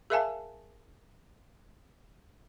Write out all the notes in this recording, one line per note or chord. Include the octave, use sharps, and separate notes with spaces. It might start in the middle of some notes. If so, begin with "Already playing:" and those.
G#4 A#4 E5 F5 G#5 A5